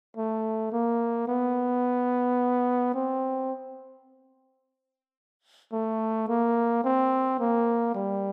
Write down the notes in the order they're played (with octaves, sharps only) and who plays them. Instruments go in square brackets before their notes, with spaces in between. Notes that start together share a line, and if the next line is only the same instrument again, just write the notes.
[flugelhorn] A3
A#3
B3
C4
A3
A#3
C4
A#3
G3